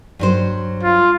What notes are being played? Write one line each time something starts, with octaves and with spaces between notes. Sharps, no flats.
G2 F#3 C5
F4